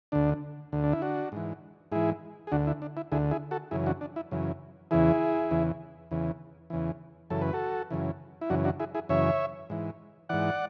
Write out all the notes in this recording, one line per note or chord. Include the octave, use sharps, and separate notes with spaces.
D2 D3 D4
D2 D3
D4
E4
D4 F#4
G#2 E3
G#2 E3 E4 G#4
G#4
D2 D3 D4 F#4
E4
D4
E4
D2 D3 E4 G#4
E4 G#4
F#4 A4
F#2 C#3 E3 E4 G#4
D4 F#4
D4
E4
F#2 C#3 E3
E2 C#3 E3 E4 G#4
E2 C#3 E3
E2 C#3 E3
E2 C#3 E3
F#2 C#3 E3 A4
B4
F#4 A4
F#2 C#3 E3
E4
F#2 C#3 E3 D4 F#4
D4 F#4
E4 G#4
E4 G#4
F#2 C#3 E3 C#5 E5
G#2 E3
G#2 E3 D5 F#5